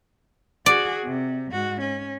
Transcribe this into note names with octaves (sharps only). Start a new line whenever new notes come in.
F#4 G#4 D5
C3
G#2 F#4
C#4